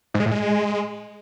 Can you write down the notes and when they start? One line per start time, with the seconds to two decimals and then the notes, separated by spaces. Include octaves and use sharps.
0.14 G#2
0.20 G#3
0.26 A2
0.31 G#3